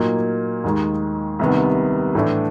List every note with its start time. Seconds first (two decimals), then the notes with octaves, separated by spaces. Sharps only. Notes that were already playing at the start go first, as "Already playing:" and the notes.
Already playing: A#2 F#3 A#3 D#4
0.64 D#2 D#3 G#3
1.39 C2 C3 D#3 G3 B3
2.15 A2 E3 A3 D4